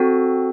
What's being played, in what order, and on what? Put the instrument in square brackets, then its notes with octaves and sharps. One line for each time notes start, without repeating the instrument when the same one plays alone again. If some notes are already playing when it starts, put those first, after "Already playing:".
Already playing: [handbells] C4 F#4 A4